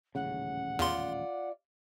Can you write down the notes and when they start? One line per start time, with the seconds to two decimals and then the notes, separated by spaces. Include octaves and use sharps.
0.15 D#1 A1 C#3 F#5
0.79 E2 F4 D5 C6